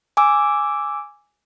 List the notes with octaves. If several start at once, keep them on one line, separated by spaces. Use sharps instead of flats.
G#5 D6 E6